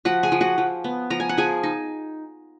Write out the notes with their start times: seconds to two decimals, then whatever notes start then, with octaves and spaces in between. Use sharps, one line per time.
0.05 F3 F#4 F#5
0.23 G#4 G#5
0.32 F3
0.41 F#4 F#5
0.58 F3
0.84 B3
1.10 F3 A#5
1.20 G#5
1.29 F#5
1.37 F3 G#4 G#5
1.63 D#4